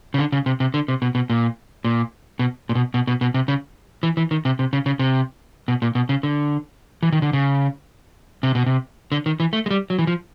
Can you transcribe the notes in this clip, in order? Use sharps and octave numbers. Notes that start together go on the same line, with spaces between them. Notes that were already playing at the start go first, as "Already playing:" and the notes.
C#3
D3
C#3
C3
C3
D3
C3
B2
B2
A#2
A#2
B2
A#2
B2
B2
B2
B2
C3
C#3
E3
E3
D#3
C3
C3
C#3
C#3
C3
B2
A#2
B2
C#3
D3
E3
D#3
D3
C#3
C3
B2
C3
D3
D#3
E3
A3
G#3
G3
F#3
E3
F3